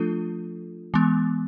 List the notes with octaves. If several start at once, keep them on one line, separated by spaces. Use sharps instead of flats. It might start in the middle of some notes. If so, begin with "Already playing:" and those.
Already playing: F3 A3 D4 F4 A4
E3 G#3 B3